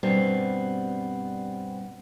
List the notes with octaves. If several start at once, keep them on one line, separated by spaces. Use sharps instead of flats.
G2 B2 G3 B3 C4